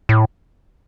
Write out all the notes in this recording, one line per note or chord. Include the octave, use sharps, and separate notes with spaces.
A2